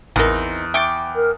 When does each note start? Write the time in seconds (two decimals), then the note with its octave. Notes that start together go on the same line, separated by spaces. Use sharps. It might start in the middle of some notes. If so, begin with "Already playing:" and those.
0.16 A1 E2 C4 D#4 A#4
0.74 E5 G5 C#6 D6 A6
1.15 A#4